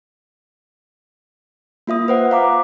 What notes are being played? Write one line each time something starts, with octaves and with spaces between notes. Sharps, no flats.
A#3 F4 E5 D#6
B4 C5 F#5
F5 A#5 D6